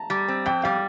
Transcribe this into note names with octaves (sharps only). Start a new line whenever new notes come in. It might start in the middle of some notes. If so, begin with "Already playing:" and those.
Already playing: A5 A#5
G3
C4
F2 G5
G3 F5